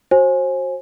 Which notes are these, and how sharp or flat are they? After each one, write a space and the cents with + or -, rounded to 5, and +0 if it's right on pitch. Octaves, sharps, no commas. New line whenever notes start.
F#4 +0 C5 +30 G#5 +0